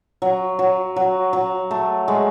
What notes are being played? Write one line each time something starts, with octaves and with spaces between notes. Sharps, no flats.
F#3
F#3
F#3
F#3
A3
G#3